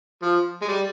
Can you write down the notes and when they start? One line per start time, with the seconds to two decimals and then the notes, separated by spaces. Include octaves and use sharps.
0.22 F3
0.62 G#3
0.68 G3